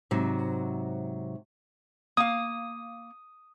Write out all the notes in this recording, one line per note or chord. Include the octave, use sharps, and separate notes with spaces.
G#2 C3 F#3 F#4
A#3 F5 D#6